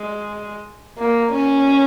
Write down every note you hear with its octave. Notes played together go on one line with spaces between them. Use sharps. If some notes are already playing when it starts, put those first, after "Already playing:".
Already playing: G#3
A#3
C#4